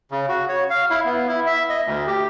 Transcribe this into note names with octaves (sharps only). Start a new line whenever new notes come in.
C#3
F#4
C#5
F5
E4
B3
E4
E5
D#5
D2
G4